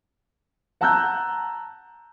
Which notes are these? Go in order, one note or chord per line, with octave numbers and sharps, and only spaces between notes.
F#5 A5 A#5 E6 F#6 G6